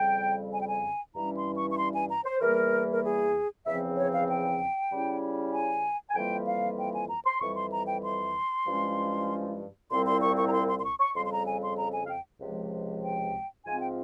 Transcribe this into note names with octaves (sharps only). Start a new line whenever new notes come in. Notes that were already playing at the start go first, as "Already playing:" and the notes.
Already playing: F2 C#3 G3 G5
G#5
G5
G#5
G2 E3 G3 C#4 E4 A#5
C6
C#6
C#6
C6
G#5
A#5
C5
E2 E3 G3 A#3 A#4
A#4
G#4
E2 C#3 F3 C4 E5
C#5
F5
G5
C#3 G3 C#4 E4
G#5
G#5
F2 E3 G3 A#3 F4 G5
F5
G5
G#5
A#5
C6
F2 E3 G3 C#6
C6
A#5
G5
C6
G2 F3 G#3 C#4 E4
C2 A#2 G3 C4 E4 C6
C6
C#6
C#6
A#5
C6
C6
C6
C#6
C#6
F2 C#3 G3 C6
C6
A#5
G#5
C6
A#5
G#5
F5
G5
C#2 C3 F3 G#3
G5
G#2 F3 C4 F4 G#5
G5